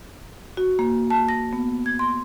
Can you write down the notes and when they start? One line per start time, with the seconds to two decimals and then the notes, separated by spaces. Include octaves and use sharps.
0.57 F#4
0.79 A#3
1.10 A5
1.29 A#6
1.53 B3
1.86 G#6
1.99 C6